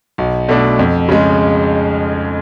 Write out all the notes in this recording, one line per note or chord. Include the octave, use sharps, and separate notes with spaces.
B1
B2 A3 D4
F2
C#3 G#3